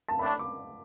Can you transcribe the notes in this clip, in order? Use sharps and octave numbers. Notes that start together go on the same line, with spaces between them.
A5
A2 A3 D4 B5
D6